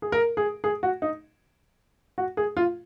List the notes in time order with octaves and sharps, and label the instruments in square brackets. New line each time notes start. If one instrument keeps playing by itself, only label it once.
[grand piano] G#4
A#4
G#4
G#4
F#4
D#4
F#4
G#4
F4